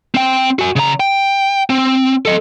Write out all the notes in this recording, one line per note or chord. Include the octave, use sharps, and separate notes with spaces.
C4 G5
F#4 G#5
C#3 A#5
G5
C4
A4 D#5